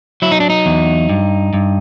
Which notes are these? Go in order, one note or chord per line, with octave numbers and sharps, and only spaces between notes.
F#3 E4
D#4
D4
D#4
E2
G2
G2